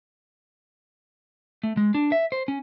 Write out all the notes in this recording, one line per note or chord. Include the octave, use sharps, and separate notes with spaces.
A3
G#3
D4
E5
C5
C#4